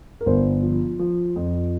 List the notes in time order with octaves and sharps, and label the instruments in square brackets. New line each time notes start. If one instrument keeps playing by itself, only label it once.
[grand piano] A#4
G1 C5
F3
F3
F2